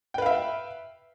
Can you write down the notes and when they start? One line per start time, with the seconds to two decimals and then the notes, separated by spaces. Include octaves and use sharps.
0.14 G5
0.18 B4
0.22 F5
0.26 E5